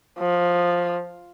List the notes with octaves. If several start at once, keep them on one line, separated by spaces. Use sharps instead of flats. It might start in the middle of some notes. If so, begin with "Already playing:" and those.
F3